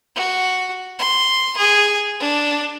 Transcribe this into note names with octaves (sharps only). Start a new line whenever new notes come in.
F#4
C6
G#4
D4